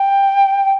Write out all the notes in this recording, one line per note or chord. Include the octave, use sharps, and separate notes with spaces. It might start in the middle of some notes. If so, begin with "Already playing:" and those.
Already playing: G5